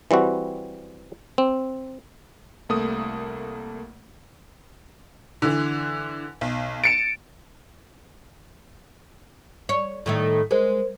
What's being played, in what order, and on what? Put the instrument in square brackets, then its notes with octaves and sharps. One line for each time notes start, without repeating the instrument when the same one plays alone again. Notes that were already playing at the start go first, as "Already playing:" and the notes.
[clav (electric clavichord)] E3 G3 C4 F#4
C4
[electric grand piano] C2 A3 A#3 D#6
[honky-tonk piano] D3 E3
B1
[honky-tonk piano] A6 C#7 E7 [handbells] D7
[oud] C#5
A2 D#3 A3
[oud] G#3 [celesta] A#4 C5